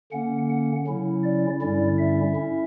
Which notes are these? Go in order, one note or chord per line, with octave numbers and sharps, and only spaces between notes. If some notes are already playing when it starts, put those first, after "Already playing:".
D3 A#3 C#4 F#5
F#5
C#3 F#3 C#4 E4
D5
G2 D3 G3 C#4 E4 D5
E5
C#4 E4